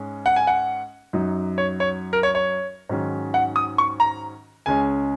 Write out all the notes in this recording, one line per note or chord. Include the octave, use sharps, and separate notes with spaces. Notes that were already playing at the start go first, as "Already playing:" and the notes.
Already playing: G#2 G#3 C#4
F#5
G#5
F#5
F#2 F#3 D#4
C#5
C#5
A#4
C#5
C#5
G#2 D#3 F#3 C#4
F#5
D#6
C#6
A#5
C#2 C#3 G#3 C#4 G#5